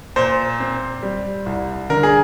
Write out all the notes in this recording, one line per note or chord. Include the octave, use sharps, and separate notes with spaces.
A#2 C5
C4
G3
C2
D3 A#4
G#4